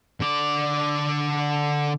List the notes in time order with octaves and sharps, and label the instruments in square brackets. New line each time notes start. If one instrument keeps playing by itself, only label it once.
[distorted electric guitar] D3 D5